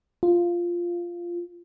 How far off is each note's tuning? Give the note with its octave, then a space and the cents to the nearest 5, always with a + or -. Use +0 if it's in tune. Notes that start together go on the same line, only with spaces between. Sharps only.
F4 -5